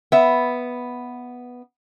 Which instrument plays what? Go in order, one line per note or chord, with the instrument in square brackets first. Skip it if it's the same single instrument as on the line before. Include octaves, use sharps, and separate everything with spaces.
[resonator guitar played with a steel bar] B3 E5